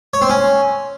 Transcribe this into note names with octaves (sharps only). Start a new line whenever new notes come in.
C#5
C4
C#4